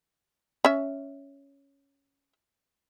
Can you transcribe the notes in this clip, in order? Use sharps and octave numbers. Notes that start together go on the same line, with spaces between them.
C#4 E5